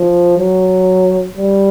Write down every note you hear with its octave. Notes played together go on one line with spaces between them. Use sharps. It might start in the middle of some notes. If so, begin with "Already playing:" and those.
Already playing: F3
F#3
G3